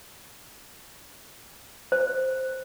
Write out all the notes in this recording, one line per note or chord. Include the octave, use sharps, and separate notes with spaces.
C5